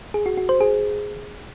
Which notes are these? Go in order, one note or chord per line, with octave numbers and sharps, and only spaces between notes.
G#4
F#4
F#4
C5
G#4